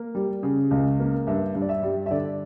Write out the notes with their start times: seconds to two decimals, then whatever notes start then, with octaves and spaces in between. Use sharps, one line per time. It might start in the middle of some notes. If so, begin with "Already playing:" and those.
Already playing: A#3
0.15 G3
0.43 C#3
0.71 C#2
1.00 A#3
1.27 G2 E5
1.55 G2
1.62 D5
1.69 E5
1.83 G3
2.06 E5
2.11 D3 D5